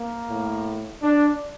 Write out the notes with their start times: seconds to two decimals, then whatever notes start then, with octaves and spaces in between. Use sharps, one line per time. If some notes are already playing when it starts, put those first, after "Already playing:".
Already playing: A#3
0.29 A2
1.03 D4